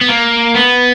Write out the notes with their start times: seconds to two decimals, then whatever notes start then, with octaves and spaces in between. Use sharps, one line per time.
0.01 B3
0.09 A#3
0.56 B3